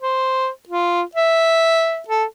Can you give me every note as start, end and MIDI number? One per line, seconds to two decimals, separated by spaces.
0.02 0.48 72
0.69 1.02 65
1.15 2.02 76
2.08 2.24 69